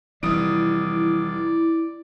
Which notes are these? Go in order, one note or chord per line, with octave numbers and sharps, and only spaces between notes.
F1 E3 F3 G3 E4 D5 D#6 D7